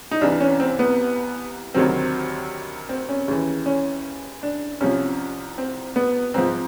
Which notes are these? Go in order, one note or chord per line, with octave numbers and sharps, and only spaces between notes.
D#4
C2 C3 E3 D4
C#4
C4
B3
D2 C3 D#3 F#3 C4
C4
C#4
D#2 C#3 E3
C#4
D4
C2 C3 F3 C#4
C4
B3
G#2 F3 C4